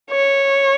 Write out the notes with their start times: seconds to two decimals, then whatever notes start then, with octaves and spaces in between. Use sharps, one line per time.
0.11 C#5